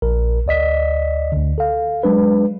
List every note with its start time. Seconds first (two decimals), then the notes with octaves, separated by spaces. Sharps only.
0.02 A#1 A#4
0.46 D2 D5 D#5 B6
1.32 D2 D3
1.58 A4 F5
2.03 F#3 G#3 D4 B4